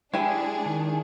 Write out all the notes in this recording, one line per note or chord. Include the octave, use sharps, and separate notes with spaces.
G#3 D4 E4 G4 G#4 G#5
D#3